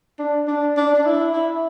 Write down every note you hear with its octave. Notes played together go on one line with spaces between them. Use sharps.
D4
D4
D4
D4
E4
E4